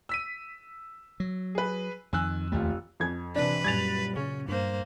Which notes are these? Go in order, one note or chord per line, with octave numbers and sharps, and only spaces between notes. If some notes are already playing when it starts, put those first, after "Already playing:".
E6 B6 D#7
F#3
G#4 B4
F2 D#3 G#5 E6 F#6
F1 D#2 A3 F4
F2 G#6
C3 E3 D4 B4
F#2 A#2 G3 G#6 A6 F7
C#3 C#4
G2 A#3 C5